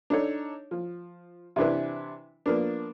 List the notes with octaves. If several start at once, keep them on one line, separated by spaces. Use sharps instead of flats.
D4 D#4 A4 C#5
F3
C3 E3 D4 E4 B4
F3 A#3 B3 D4